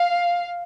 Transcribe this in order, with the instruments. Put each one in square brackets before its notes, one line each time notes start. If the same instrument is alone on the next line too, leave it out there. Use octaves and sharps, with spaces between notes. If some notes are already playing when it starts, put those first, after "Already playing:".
Already playing: [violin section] F5